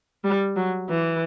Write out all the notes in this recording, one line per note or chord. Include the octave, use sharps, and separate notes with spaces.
G3
F#3
E3